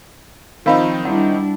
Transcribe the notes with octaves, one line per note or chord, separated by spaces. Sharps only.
D#3 F3 C4 D#4 A#4 F5 B5
G3 D4 E4 F#5